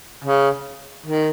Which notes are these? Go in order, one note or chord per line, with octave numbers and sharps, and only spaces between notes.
C#3
D#3